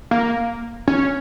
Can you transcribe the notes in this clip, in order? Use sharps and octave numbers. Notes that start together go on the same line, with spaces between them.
A#3
C#4